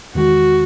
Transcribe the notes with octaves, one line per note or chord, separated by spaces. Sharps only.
E2 D#3 G#3 F#4